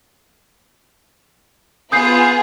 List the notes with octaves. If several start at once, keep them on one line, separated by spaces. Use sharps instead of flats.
B3 F4 G#4 D#6 G6 C7